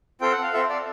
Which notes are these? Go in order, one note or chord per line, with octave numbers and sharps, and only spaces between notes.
C4 F4 A4 G5
F#5
F5
C4 F4 A4 E5
D5